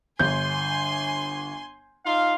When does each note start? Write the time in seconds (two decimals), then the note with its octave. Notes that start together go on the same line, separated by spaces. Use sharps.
0.19 G1 G#5 C6 G6
2.05 D#4 F4 F5